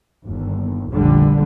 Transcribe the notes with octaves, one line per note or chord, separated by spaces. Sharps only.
G1 D#2
F1 A#1 D#2 A#2 D3 G3